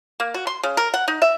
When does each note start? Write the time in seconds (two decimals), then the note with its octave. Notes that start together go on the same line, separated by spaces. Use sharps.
0.20 A#3
0.34 F#4
0.47 C6
0.63 C#3
0.77 A#4
0.94 F#5
1.08 D#4
1.22 E5